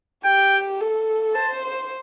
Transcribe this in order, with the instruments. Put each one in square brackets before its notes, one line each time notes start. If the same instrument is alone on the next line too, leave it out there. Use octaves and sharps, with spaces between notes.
[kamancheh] G4 [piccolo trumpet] G5
[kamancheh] A4
[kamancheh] C5 [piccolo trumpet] A5